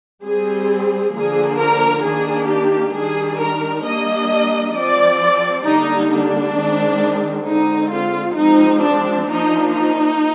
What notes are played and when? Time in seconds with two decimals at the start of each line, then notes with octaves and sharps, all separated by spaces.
0.24 G3 C4 G#4
1.14 D3 F3 A#3 D4 G#4
1.59 A#4
2.05 D#3 A#3 D4 G#4
2.49 G4
2.95 D#3 G3 D4 G#4
3.40 A#4
3.85 G3 A#3 D4 D#5
4.76 F3 C4 D5
5.65 D3 G3 A#3 D4 D#4
6.10 D4
6.56 D#3 G#3 C4
7.46 D3 G#3 C4 D#4
7.91 F4
8.37 F3 G#3 C4 D#4
8.82 D4
9.27 F3 A#3 D4 D#4
9.72 D#4